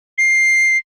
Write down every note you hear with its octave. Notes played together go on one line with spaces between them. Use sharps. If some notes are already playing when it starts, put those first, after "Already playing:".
C7